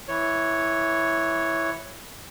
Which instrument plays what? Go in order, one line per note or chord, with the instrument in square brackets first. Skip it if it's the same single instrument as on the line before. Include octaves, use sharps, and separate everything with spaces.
[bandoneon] E3 C#5